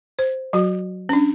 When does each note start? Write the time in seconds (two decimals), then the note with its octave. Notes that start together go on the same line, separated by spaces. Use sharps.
0.19 C5
0.53 F#3 F#4
1.09 C#4 D4